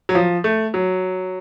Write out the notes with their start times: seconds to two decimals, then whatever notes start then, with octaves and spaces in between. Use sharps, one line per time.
0.09 F#3
0.15 F3
0.44 A3
0.74 F#3